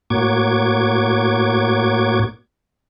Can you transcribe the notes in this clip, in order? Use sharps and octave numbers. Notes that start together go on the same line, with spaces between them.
A2 A#3 F#4 C#5 D6 G#6